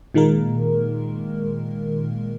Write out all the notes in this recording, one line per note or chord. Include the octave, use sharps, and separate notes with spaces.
A#2 D#3 G#3 A#3 A#4